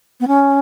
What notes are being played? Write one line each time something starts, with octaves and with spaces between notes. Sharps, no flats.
B3
C#4